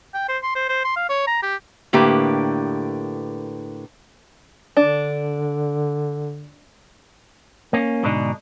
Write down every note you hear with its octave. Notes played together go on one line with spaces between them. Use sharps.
G5
C5
C6
C5
C5
C6
F5
C#5
A#5
G4
A2 D3 A#3 G4 B4
D3 D4
A#3 C#4
G#2 B2 D3 D4 D#4